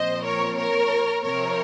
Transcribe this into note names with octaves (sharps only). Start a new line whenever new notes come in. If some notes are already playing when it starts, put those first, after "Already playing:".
Already playing: A#2 F3 C4 C5 D#5
A#4 C#5
A#4 C#5
C3 F3 C4 A#4 C#5